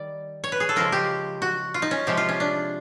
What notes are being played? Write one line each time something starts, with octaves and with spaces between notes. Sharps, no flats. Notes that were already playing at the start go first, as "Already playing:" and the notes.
Already playing: D#3 G3 D5
C#5
B4
G#4
A4
C#3 F3 G#3 A#4
G4
F#4
F4
D#4
C#4
C3 F3 G#3 G4
F4
C#4
D4